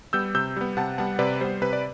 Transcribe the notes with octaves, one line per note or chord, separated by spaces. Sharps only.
G3 B3 E6 G6
C3 E6 G6
G3 B3
C3 F#5 A5
G3 B3 F#5 A5
C3 B4 D5
G3 B3 C5
C3 B4
D5